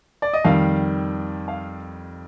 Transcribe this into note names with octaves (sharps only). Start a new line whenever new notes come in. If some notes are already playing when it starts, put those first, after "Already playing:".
D5
D#5
F2 D#3 G3 F5
F5